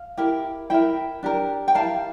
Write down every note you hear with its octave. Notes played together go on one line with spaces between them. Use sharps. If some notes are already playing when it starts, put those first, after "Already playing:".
Already playing: F5
E4 G4 A#4
E4 A#4 E5 G5
D4 G4 A#4
G5
E4 G4 A#4 F5 A5